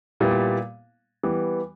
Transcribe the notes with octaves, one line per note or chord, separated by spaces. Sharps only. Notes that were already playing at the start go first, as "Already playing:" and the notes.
A#2 G3 B3 E4
E3 G3 B3